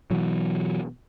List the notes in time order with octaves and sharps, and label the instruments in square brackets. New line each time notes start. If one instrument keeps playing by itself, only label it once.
[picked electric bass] B2 E3 F#3